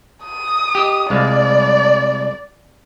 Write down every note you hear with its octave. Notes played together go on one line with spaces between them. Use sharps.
D#6
G4 D#5
C2 G#3 D5 F5